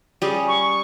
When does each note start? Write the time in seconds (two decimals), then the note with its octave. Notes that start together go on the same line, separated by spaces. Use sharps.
0.22 G3 C#4 G#4
0.48 C#6